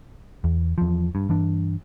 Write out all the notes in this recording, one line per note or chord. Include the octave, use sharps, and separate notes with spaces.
E2
E2 F3
G2
G2 E3 D4